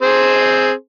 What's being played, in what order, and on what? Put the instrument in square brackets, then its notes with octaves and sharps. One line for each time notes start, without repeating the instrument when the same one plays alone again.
[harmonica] C4 G#4 C5